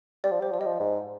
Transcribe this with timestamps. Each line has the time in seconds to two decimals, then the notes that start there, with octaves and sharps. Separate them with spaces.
0.24 G3 D5
0.32 F3
0.40 G3 C5
0.52 F3 D5
0.59 G3 D#5
0.66 F3
0.80 G#2